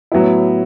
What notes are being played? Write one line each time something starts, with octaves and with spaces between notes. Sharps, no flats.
A2 F#3 B3 E4